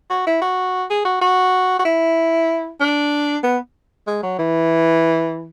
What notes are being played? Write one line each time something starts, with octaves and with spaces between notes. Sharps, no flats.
F#4
E4
F#4
G#4
F#4
F#4
F#4
E4
D4
B3
G#3
F#3
E3